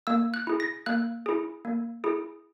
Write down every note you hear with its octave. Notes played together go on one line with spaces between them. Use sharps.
A#3 E6
F#6
E4 G#4
A#6
A#3 F#6
E4 G#4
A#3
E4 G#4